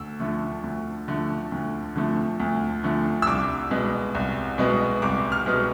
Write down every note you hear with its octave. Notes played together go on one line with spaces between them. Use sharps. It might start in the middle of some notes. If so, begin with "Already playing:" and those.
Already playing: D2 E6
D3 F3 A3
D2
D3 F3 A3
D2
D3 F3 A3
D2
D3 F3 A3
E6
C2 D6
B2 G#3 B3
C2
B2 G#3 B3
C2 D6
F6
B2 G#3 B3